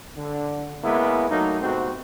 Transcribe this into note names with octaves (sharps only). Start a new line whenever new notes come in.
D3
G#3 A#3 B3 C#4 E4
F#3 A3 A#3 D#4
G#2 C3 A3 B3 C4 F#4